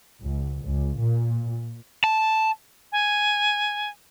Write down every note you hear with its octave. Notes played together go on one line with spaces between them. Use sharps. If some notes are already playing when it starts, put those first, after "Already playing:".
C#2
C#2
A#2
A5
G#5